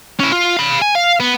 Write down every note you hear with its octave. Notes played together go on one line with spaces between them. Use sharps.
C#4 E4
F4
F5 B5
G#5
F5
B3